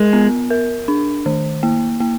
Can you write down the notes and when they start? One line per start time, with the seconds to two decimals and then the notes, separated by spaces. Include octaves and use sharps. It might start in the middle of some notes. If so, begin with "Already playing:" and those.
Already playing: G#3 A#4
0.13 B3
0.50 A#4
0.88 D4
1.26 D#3
1.63 A#3
2.00 A#3